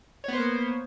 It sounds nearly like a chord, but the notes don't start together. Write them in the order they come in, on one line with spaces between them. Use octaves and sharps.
C#5 B3 C5 A#3